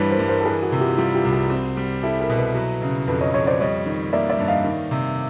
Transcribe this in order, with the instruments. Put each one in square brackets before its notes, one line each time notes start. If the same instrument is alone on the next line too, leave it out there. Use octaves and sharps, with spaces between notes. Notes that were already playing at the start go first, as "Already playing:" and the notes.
Already playing: [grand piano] G2 E3 G3 [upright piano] B4 C#5
[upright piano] A#4 C5
[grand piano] G2
[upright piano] A#4 C5
A4
[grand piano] E3 [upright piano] G#4 A#4
[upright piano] F#4 G#4
[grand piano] C3
[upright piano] F4 G4
[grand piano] G3 [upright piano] F4 G4
[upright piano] F4 G4
[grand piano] C2
[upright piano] F#4 G#4
[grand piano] C4
G3
[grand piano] E4 [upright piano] G4 A4
[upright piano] G#4 A#4
[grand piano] B2
[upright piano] A4 B4
[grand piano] F#3
C#3
[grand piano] F2 [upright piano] A4 B4
[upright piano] C#5 D#5
[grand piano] F2 [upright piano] C#5 D#5
[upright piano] C5 D5
[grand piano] G3 [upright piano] C#5 D#5
[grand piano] D#3
[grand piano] A#3 [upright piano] D5 E5
[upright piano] D5 E5
[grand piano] G2
[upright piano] D#5 F5
[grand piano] D#3
C3